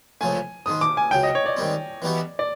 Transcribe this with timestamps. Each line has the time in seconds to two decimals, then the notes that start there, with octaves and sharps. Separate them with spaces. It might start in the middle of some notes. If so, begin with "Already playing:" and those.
0.21 C#2 C#3 F3 A3 G#5
0.66 G#2 D#3 G#3 D#6
0.81 D6
0.97 G#5
1.11 C#2 C#3 F#3 G5
1.23 D#5
1.35 C#5
1.46 D5
1.57 G#2 D#3 G3 C4
2.02 E3 G3 B3 D#4 F#4
2.39 D5